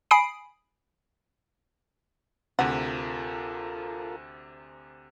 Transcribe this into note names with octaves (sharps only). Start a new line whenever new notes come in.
G#5 B5 D#6 C7 D7
D2 C3 F4 A4 A#4 F#5